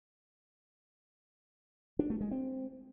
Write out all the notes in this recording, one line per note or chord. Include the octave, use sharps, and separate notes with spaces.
D4
A3
G#3
C4